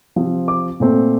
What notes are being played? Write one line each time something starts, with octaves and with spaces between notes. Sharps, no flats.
C3 F3 C4
D6
A#2 A3 C4